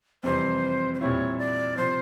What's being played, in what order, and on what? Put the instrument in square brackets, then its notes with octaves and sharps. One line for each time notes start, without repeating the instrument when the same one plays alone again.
[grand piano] F2 C3 E3 G3 [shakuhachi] C5
[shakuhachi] C5
[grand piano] A#2 G3 C4 E4 [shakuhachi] C#5
[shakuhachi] D5
[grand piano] C3 F3 [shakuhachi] C5